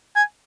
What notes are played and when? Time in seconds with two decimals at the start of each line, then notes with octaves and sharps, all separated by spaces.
0.16 G#5